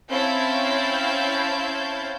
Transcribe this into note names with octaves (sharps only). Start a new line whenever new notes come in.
C4 C#4 E4 F5 A5 G6